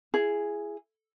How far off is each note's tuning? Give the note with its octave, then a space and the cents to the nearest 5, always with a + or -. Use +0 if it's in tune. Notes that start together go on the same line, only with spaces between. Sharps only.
E4 +25 G#4 +0